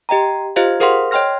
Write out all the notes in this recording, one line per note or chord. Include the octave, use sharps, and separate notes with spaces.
G4 D#5 G5 A#5
F4 G4 C5 D#5 F5
G#4 A#4 C5 F5 F#5 C6
C#5 D#5 G5 C6 F6 A#6